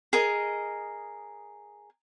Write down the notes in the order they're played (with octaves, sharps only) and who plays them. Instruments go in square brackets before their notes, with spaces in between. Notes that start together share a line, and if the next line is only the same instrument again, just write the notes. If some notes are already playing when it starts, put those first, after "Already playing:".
[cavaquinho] G#4 A#4 D#5